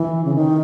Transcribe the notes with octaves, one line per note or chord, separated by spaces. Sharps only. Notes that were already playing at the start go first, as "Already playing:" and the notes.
Already playing: E3
C#3
D#3